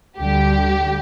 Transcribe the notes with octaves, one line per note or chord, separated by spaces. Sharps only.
D2 D3 G3 G4